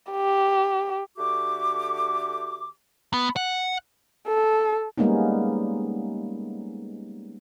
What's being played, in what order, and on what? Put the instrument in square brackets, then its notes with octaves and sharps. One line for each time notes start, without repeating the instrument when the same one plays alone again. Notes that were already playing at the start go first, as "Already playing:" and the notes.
[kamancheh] G4
[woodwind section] D3 A3 F#4 G4 D6
[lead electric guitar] B3
F#5
[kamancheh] A4
[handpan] G3 G#3 A#3 B3 C#4 D#4